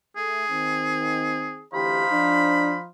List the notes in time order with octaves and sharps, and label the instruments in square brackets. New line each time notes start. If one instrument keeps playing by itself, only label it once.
[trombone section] A3 [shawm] G#4
[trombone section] D#3 C4
[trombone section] D2 E3 G4 [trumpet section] D#4 C5 F5 [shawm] B5
[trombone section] F3 [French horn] D4